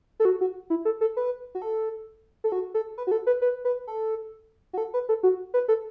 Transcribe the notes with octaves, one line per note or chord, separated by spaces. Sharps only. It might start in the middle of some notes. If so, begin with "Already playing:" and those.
A4
F#4
F#4
E4
A4
A4
B4
F#4
A4
A4
F#4
A4
B4
F#4
A4
B4
B4
B4
A4
F#4
A4
B4
A4
F#4
B4
A4